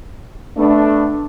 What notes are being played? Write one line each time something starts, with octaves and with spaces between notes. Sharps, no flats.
A3 B3 D4